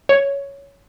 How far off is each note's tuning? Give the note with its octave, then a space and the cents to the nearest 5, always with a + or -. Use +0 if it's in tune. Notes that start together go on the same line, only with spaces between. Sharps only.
C#5 +10